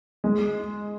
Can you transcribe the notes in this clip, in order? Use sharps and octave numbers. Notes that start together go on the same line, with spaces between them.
G#3